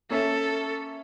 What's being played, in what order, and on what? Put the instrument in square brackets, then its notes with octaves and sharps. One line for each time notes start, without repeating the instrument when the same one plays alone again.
[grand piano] A#3 C#4 E5 [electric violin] A4